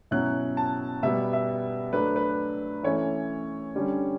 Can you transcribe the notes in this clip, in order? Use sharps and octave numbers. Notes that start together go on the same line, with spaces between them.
B2 F#3 C#4 E4 F#6
A5
B2 G3 B3 E5
E5
F#3 A3 D4 B4
B4
E3 A3 C#4 E4 C#5
D3 G3 C#4